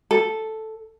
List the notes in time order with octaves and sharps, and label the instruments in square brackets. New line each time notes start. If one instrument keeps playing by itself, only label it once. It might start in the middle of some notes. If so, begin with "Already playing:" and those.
[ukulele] A4